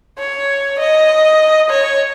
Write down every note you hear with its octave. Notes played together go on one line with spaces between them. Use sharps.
C#5
D#5
C#5